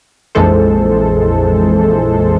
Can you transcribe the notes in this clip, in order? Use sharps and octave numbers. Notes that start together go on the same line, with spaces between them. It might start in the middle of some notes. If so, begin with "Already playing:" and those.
A#1 F2 E3 G#3 A4 C5